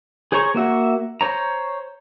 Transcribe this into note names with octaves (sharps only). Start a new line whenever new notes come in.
G#4 C5 C#5 A#5 C#6
A#3 F#4 E5 F#5
C5 C#5 A#5